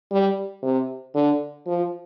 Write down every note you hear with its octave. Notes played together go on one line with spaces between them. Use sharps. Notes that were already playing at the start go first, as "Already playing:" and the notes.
G3
C3
D3
F3